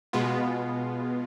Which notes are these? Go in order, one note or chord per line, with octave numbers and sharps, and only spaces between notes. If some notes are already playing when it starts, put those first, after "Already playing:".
B2 G#3 B3 F4